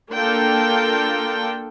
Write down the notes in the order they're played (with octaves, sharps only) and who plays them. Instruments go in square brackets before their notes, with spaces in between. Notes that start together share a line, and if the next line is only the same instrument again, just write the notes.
[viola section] A#3 D4 F4 A4 A#4 G5